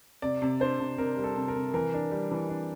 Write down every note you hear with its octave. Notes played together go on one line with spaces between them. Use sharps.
C3 D5
C3
D4 C5
C3
C3 A#4
G3
A4
C3
A#4
C3
E3 A#4
D4
G3
E3
D4